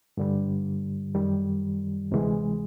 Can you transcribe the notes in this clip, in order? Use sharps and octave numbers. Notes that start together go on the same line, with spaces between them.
G2 D3 G3
F#2 D#3 G3
D2 C3 E3 G#3